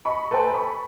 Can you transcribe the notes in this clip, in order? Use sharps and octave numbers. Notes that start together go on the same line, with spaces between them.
D#5 B5 C#6
A4 B4 C5 G5 G#5 A#5
B5 C#6